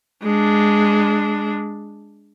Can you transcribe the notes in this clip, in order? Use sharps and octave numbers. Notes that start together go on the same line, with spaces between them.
G#3 D4